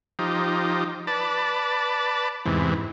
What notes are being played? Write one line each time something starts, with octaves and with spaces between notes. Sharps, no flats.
F3 D#4 G4
B4 D5 A5
E2 G#2 C3 E3